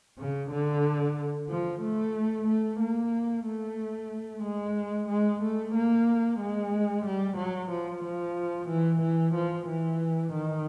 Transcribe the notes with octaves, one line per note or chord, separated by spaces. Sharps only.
C#3
D3
F3
A3
A3
A#3
A3
G#3
G#3
A3
A#3
G#3
G3
F#3
F3
F3
E3
E3
F3
E3
D#3